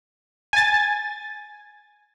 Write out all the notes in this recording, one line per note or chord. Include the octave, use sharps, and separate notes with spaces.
G#5 A6